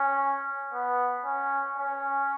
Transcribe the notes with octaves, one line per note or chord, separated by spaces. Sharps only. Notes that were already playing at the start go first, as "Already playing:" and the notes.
Already playing: C#4
B3
C#4
C#4